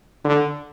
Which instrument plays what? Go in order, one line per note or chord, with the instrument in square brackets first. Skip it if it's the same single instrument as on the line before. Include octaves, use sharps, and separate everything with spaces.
[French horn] D3